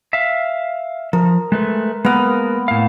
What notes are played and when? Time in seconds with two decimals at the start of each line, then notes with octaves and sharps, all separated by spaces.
0.13 E5 F5
1.13 F3 A#4
1.52 G#3 A3 B4
2.05 G#3 A#3 B3 A#4 B4
2.68 A2 F5